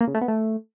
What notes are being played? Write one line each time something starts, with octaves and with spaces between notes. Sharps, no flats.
A#3
C#3
A3
B3
A3